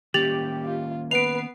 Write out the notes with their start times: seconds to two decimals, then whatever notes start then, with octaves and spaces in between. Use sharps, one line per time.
0.14 D#3 A#3 C#4 G4 A6 F7 F#7
0.65 F4
1.11 B3 B4 C7 D7 F7